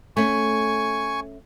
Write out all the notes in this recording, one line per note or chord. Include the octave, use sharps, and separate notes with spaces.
A3 C#4 G#5 C#6